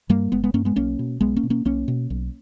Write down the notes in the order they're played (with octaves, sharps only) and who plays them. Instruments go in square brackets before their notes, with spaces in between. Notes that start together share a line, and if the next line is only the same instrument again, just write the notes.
[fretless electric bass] G2 G3 A#3
G1 G#3 B3
G#3 B3
G2 A#3 C#4
G#3 B3
B1 A#3 C#4
B2
B1 G#3 B3
A#3 C#4
B2
A#3 C#4
B1 A#3 C#4
B2
B1